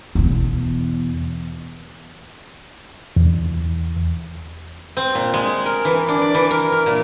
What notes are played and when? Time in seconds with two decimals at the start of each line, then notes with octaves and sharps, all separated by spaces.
0.15 E2 B2
3.16 E2
4.97 C4
5.15 A#2
5.34 G#3
5.66 A#4
5.85 E3
6.09 D4
6.22 D5
6.35 E3
6.51 A#4
6.72 A#4
6.86 A#2